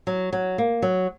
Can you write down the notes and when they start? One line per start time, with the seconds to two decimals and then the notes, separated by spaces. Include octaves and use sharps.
0.07 F#3
0.33 F#3
0.58 A#3
0.82 F#3